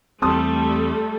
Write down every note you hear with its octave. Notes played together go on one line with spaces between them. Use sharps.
E2 G3 A3 C4 A4 A5 C6 D#6